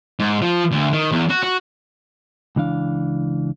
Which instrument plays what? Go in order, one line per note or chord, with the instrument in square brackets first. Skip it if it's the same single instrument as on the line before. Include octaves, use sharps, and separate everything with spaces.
[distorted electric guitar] G#2
F3
D2
D#3
E2
F#4
F#4
[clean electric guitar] C#2 E3 D4 F5